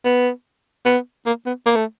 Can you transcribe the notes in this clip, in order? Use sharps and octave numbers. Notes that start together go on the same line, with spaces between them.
B3
B3
A#3
B3
A#3
A3